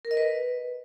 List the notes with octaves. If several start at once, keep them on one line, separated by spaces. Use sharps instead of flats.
A#4
D#5
B4